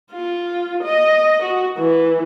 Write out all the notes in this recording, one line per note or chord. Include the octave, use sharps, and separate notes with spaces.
F4
D#5
F#4
E3